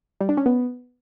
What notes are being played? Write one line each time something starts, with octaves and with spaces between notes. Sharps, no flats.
G3
D4
C#4
B3